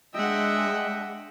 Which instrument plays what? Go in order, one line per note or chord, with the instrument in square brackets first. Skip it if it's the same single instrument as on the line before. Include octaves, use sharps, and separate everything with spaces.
[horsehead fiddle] G#3 D4 [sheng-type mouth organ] D#5 G5 [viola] E5 F#5